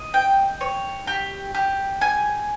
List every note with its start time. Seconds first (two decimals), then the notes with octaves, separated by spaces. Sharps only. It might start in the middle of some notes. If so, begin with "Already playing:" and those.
Already playing: D#5
0.14 G5
0.61 C#5
1.07 G4
1.55 G4
2.01 G#5